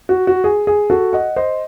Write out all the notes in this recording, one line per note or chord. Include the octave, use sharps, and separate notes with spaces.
F#4
F#4
G#4
G#4
F#4 A4
D#5 F#5
C5 D#5